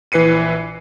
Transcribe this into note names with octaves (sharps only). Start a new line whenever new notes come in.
A#1 E3 B4 C7 C#7 D#7